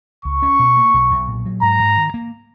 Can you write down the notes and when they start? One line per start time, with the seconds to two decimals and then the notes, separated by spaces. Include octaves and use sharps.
0.25 C#2 C#6
0.42 C#4
0.59 B2
0.77 A#3
0.94 B1
1.11 B1
1.28 A#2
1.46 F#3
1.63 G#2 A#5
1.79 G#2
1.97 D#3
2.14 A#3